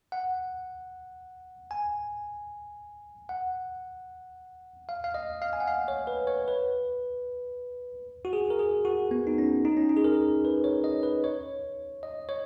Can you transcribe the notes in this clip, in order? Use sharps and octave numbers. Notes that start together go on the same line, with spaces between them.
F#5
G#5
F#5
F5
F5
D#5
F5
G#5
F#5
F5
C#5
B4
C#5
B4
F#4
G#4
A#4
G#4
F#4
B3
D#4
C#4
D#4
C#4
D#4
G#4
A#4
B4
C#5
D#5
B4
C#5
D#5
C#5